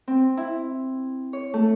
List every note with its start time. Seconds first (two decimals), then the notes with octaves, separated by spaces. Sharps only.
0.08 C4
0.37 E4
1.33 C#5
1.54 A3